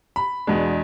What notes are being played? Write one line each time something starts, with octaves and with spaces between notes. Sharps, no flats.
B5
E2 B2 G#3 D4